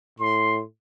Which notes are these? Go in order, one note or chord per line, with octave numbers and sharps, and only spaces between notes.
A2 C6